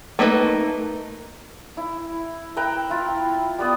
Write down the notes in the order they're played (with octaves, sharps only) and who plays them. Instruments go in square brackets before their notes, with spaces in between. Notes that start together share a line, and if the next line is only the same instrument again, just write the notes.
[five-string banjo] A3 A#3 D#4 B4
[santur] E4
B4 E5 G5 A#5
E4 F4
G3 B3 D#6